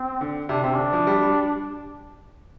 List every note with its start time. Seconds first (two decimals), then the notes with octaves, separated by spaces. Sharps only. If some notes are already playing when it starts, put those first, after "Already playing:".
Already playing: C4
0.21 D3
0.49 C3 D4
0.63 C3 C4
0.75 D3 D4
0.93 F3
1.07 G3
1.21 G3